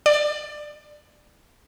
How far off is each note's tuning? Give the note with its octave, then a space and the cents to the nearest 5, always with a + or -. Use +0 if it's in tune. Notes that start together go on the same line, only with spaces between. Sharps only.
D5 +20